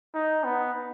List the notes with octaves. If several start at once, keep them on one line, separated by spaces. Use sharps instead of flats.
D#4
B3